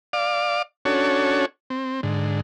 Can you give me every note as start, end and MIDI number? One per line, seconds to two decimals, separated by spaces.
0.13 0.62 74
0.13 0.62 77
0.13 0.62 86
0.85 1.45 61
0.85 1.45 62
0.85 1.45 66
0.85 1.45 69
0.85 1.45 73
1.70 2.01 60
2.03 2.41 44
2.03 2.41 50